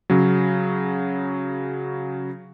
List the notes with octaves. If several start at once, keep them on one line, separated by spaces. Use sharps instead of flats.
C#3 F#3